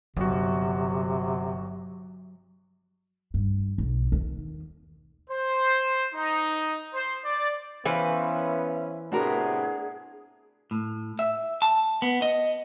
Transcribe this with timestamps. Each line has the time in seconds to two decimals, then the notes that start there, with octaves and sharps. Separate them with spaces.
0.17 G1 C3 F#3 F#4
3.34 G2
3.78 B1
4.12 D#2
5.30 C5
6.14 D#4
6.94 C5
7.24 D5
7.85 E3 B3 C#4 B4 C5 E5 F5
9.12 A2 C3 B3 D4 F#4 G#4 A#4
10.71 A2
11.19 E5
11.62 A5
12.02 B3
12.22 D#5